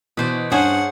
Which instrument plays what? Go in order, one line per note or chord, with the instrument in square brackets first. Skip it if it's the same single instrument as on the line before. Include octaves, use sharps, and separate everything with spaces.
[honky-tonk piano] B2 [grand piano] E3 [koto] B4 C5 D5
[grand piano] G2 [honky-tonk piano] C#4 [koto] F#4 G#4 C5 [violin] F#5